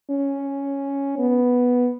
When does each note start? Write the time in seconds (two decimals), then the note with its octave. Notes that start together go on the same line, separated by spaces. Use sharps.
0.10 C#4
1.19 B3